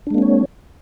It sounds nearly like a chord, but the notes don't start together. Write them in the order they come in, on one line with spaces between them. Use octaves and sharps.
D4 G#3 A#3 C4 C#5